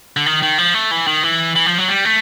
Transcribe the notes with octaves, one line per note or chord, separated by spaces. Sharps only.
D3
D#3
D#3
F3
A3
E3
D#3
E3
E3
F3
F#3
G3
A3